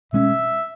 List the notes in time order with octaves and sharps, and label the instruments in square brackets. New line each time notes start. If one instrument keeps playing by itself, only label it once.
[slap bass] B2 G#3 C#4 [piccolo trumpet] E5